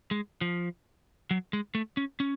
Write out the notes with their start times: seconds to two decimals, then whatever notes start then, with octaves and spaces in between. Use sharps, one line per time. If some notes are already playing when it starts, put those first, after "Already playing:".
0.11 G#3
0.41 F3
1.31 F#3
1.53 G#3
1.75 A3
1.97 C#4
2.20 C#4